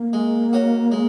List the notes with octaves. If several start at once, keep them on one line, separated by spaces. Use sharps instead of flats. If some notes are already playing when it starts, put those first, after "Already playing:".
Already playing: A#3
G#3
C#4 F#4
G#3